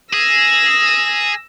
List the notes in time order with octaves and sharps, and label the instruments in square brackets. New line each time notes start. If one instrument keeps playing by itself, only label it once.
[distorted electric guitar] G#4 [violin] E6 A#6